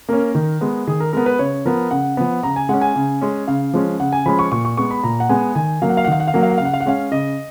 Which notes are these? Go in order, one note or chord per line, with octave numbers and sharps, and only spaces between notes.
A#3 C#4 A#4
D#3
G#3 B3
D#3 G#4
A#4
G#3 B3 A#4
B4
C#3 C#5
F3 B3 A#4
C#3 F#5
F3 B3 F#5
C#3 A#5
G#5
G#3 C#4 F#5
G#5
C#3
G#3 C#4
C#3 F5
F3 G#3 C#4
C#3 F#5
G#5
F3 G#3 C#4 B5
C#6
A#2 C#6
C#6
G#3 B3 C#6
B5
A#2 A#5
F#5
G#3 B3 G#5
D#3 G#5
F#3 A#3 F5
F#5
F5
F#5
D#3 F5
F#5
F5
F#3 A#3 F#5
F5
F#5
C#3 F5
F#5
F5
F#5
G#3 C#4 F5
C#3 D#5